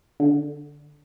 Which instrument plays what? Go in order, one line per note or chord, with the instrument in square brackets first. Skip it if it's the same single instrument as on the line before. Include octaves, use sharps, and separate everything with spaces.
[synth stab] D3